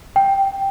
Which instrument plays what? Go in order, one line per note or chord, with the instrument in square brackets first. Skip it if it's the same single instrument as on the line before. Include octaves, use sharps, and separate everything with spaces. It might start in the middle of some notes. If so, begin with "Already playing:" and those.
[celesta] G5